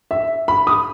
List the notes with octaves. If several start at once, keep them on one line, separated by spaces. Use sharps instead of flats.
E5
B5
D#6